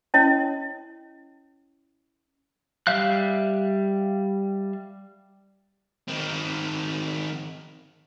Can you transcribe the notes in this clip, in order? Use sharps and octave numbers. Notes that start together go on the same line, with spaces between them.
C#4 E4 C#5 D#5
G3 E5 F5 F#6
D#3 C4